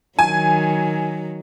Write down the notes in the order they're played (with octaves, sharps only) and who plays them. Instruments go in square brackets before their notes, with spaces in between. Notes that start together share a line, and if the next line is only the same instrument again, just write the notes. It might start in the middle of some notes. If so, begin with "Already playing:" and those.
[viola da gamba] D#3 F#3 [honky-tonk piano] G#5